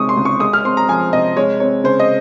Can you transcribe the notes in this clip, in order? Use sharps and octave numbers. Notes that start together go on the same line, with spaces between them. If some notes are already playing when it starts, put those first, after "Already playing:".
Already playing: C3 D#3 G#3 C#6 D#6
C6
C#2
C#6
G#3 D#6
F6
C4 C6
A#5
F3 G#5
C3 D#5
G#3 C#5
C4 C#5
C#3 C5
D#5